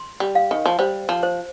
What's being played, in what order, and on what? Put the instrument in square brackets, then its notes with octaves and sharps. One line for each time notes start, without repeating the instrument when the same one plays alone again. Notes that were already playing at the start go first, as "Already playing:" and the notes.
Already playing: [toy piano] C6
[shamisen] G3
[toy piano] F5
[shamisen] D#3
F3
[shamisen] G3 [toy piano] C5
[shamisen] F3
[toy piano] C5